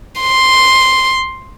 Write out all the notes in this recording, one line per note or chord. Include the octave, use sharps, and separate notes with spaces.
C6